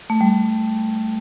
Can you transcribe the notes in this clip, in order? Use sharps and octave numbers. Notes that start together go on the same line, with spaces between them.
A3
G3